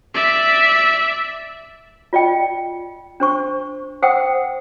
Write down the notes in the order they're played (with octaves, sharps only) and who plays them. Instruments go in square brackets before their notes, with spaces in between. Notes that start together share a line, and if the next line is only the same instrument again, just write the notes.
[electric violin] D5 E5
[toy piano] F4 D5 D#5 G5
D4 C5 C#6
C5 F#5 G5 D#6 E6